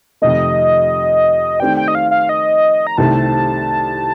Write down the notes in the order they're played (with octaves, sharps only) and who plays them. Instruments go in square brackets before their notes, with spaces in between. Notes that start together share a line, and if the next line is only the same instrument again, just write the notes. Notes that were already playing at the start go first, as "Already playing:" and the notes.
[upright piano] F2 C3 D#3 A3 [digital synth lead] D#5
[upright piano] D#3 A3 C4 G4 D5 [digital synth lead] G5
[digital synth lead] G5
D#5
F5
F5
D#5
A#5
[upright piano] C2 C3 D#3 A3 C4 [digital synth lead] A5